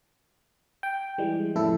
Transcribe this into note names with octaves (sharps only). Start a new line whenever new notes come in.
G5
E3 G3 G#3
F2 A2 C#3 E4 A4